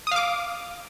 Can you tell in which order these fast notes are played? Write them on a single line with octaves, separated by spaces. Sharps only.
D#6 F5 D6